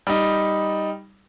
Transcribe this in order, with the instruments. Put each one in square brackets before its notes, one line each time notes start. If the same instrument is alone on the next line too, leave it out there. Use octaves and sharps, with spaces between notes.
[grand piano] G3 D#4